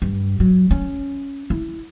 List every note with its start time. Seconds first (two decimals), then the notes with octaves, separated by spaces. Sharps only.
0.02 G2
0.40 F#3
0.71 C#4
1.50 E4